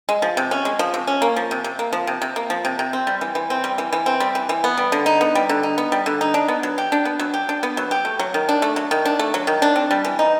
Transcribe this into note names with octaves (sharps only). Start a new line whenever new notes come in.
G#3
F3
C3
C#4
G#3
F3
C3
C#4
A#3
F3
C3
C3
A#3
F3
C3
C3
A#3
F3
C3
C3
C4
G3
E3
E3
C4
G3
E3
E3
C4
G3
E3
E3
B3
G3
D3
D#4
B3
G3
D3
D#4
B3
G3
D3
D#4
D4
B3
F#3
G4
D4
B3
F#3
G4
D4
B3
F#3
G4
A3
F#3
D#3
D4
A3
F#3
D#3
D4
A3
F#3
D#3
D4
C4
G3
E3
D#4